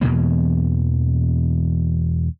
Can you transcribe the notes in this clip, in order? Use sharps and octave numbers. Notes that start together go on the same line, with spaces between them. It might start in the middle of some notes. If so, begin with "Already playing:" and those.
E2 B2 E3 A#3